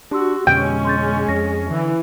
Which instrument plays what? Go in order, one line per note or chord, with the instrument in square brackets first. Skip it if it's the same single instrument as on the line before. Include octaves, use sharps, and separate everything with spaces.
[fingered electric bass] D4 [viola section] F#4 [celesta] G4 C6 E6
[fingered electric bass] F2 B2 D3 [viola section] G#3 C#4 [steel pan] G5
[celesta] C6 G6 A6
[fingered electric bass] F2 [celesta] A#6
[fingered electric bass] D3 [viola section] E3